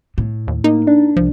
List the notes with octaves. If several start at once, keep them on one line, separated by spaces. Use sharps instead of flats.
A2
D#2
A#3 D#4
D4
C2 F3